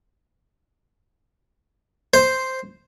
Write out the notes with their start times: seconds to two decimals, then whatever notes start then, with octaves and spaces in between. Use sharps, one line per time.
2.14 C5